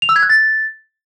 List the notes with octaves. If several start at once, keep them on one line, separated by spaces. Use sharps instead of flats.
F7
E6
G#6
F#6
A6